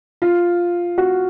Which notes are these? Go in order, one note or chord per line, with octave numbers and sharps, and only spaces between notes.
F4
F#4